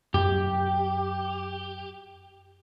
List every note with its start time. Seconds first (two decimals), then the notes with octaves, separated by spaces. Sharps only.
0.14 F#2 G4